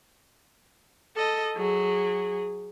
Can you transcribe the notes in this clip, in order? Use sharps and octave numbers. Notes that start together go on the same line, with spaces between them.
A4 D#5
F#3 G#4